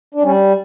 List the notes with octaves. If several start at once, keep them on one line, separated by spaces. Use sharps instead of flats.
D4
G3 C#4